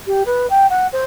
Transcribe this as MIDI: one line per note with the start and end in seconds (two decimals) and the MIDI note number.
0.06 0.23 67
0.25 0.46 71
0.49 0.66 79
0.69 0.87 78
0.92 1.04 72